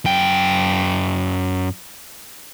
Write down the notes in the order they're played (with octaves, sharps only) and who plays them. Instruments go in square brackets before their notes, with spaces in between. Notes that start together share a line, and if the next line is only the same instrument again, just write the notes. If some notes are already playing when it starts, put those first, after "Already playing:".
[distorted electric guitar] F#2 G5